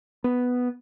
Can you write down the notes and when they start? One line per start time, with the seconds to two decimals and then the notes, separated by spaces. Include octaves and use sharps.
0.24 B3